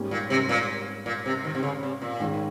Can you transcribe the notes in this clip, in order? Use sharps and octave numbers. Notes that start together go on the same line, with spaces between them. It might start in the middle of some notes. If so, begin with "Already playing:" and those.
Already playing: G#2 G3 A#3 C#4
A#2
C3
A#2
A#2
C3
D#3
C3
C#3
C3
A#2
G#2 D#3 G#3 C#4